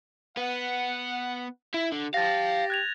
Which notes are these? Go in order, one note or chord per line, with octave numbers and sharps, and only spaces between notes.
B3 F#5
E4
D3
G4 F5 A5 A6 A#6
F#6 G#6 F7